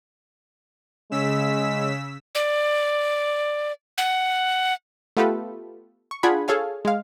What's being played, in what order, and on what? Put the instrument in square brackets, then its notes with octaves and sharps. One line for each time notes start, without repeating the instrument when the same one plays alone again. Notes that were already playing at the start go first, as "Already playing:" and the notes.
[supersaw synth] C#3 E6 B6 [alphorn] G#3
[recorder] D5
F#5
[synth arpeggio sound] A3 B3 F4 G4 A4 B4
C#6
D4 F4 G#4 F#5 G#5 B5
G#4 A4 C#5 F5 G#5
G#3 F5